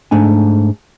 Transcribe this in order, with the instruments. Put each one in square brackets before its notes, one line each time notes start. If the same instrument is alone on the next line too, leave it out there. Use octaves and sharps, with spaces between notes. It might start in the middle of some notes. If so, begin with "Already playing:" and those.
[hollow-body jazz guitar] G#2 A3 D4 G#5